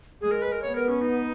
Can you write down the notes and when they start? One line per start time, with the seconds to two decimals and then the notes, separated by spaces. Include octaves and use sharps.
0.21 G#3 G#4
0.31 A#4
0.42 B4
0.52 A#4
0.62 B3 C#5
0.75 A#4
0.89 C#4
1.01 D#4